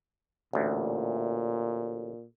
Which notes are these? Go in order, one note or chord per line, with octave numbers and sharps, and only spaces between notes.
A1 D2 A#2